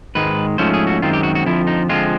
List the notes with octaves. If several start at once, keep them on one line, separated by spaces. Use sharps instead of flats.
G#2 D#3 G#3 B4
G#2 F3 A3 C#4 C5
G#4
F#4
F#2 D#3 G#3 C4 F4
G4
F#4
F#4
F2 D3 F3 E4
D#4
D3 F3 G#3 C4 F4